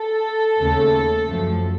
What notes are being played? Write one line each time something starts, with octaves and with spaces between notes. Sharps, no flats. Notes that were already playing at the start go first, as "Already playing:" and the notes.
Already playing: A4
D#2 C#3 A3
F#2 F3 A3